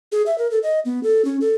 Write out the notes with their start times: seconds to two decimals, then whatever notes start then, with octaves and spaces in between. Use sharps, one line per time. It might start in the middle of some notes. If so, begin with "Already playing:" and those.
0.12 G#4
0.26 E5
0.38 A#4
0.51 A4
0.63 D#5
0.85 B3
1.03 A4
1.25 C#4
1.41 A4